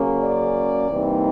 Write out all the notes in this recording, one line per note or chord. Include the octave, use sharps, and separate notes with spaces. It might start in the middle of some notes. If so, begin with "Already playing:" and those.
Already playing: C#3 F#3 A#3 C#4
D5
C3 E3 G3 A#3 D#4